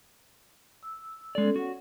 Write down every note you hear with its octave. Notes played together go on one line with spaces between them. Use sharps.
E6
G#3 B3 C#4 A4 D5
F#4 C#5 F#5